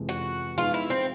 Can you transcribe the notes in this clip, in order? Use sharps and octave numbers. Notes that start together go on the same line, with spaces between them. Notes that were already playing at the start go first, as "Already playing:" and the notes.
Already playing: F2 C3 E3 G#3 B3
F#4
F3 G#3 B3 D#4 F4 G#4
E4
C4